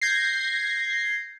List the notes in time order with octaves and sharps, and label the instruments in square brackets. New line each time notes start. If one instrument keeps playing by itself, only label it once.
[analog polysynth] G6 G#6 A#6 C7